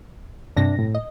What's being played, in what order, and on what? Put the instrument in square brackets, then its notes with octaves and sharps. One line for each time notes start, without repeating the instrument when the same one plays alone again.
[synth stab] G2 C3 A#6 [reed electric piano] D4
[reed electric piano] A2
[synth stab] D#5